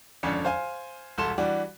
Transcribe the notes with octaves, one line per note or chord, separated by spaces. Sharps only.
G#1 F2 D3 C#4 D5 C#7
C5 F5 G#5
E1 C2 A4 C6 E7
E3 G3 D4 F#4